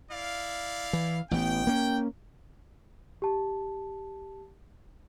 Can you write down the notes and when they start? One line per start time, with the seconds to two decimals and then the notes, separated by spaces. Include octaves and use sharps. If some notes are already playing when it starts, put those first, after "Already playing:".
0.12 E4 D5 F5
0.93 E3
1.31 A1 E3 B3 G5
1.67 A#3 C#4
3.22 G4 A5